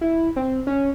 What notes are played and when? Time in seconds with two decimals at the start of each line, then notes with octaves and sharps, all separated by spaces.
0.01 E4
0.36 C4
0.67 C#4